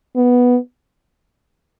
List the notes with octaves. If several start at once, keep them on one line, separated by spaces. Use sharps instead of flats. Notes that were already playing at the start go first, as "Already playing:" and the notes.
B3